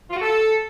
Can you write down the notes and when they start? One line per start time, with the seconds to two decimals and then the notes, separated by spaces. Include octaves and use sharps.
0.10 F4
0.16 F#4
0.22 A4